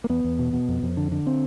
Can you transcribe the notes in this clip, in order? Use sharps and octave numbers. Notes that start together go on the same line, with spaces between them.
A#3
E2 B3
E2
B2
B2
F2
F2
D3
D3
C4